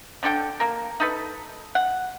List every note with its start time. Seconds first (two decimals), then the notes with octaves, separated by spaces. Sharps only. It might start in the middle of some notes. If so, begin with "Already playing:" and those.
0.23 D3 D4 A4 G5
0.60 A#3 A#4
1.00 D#4 A4 B4
1.75 F#5